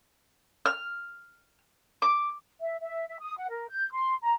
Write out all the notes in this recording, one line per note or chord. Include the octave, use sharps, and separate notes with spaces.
F6
D6
E5
E5
E5
D#6
F#5
A#4
G6
C6
A#5